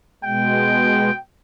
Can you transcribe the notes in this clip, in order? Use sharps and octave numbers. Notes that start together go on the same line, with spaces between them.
B2 G#3 G5